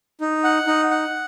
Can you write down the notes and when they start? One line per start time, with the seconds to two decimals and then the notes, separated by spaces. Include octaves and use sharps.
0.21 D#4
0.44 F#5
0.67 D#4
0.91 F#5